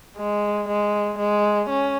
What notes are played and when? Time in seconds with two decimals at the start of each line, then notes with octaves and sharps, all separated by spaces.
0.17 G#3
0.68 G#3
1.18 G#3
1.69 C#4